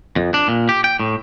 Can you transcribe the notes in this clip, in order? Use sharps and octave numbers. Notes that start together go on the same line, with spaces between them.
F2
D4
A#2
G4
G5
A2